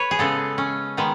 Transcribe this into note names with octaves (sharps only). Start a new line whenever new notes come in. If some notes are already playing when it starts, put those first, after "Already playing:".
Already playing: B4 C#5
G#4
C#3 G#3 B3 A4
C#4
D#3 G#3 B3